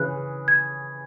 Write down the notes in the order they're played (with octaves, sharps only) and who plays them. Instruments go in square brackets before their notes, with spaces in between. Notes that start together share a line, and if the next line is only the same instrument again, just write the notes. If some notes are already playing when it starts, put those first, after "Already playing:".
Already playing: [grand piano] C#3 E3 C#4 G#4 [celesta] F#6
[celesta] G#6